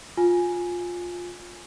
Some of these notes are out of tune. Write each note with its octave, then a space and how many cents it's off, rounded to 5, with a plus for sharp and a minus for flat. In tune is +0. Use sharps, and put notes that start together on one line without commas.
F4 +15 G#5 +0